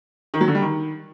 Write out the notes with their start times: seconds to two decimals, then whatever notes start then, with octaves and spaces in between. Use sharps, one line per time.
0.34 D#3
0.41 F#3
0.48 D3
0.55 G3
0.62 D#3